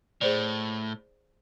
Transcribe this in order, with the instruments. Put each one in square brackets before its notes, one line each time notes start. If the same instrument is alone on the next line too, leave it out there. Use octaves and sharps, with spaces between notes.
[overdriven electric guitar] A2 [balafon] G#4 C5 D5